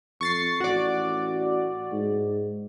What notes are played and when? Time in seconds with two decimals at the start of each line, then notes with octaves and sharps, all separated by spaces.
0.21 F2 C#6 A6 C7
0.60 A1 F#4 D5
1.92 G#2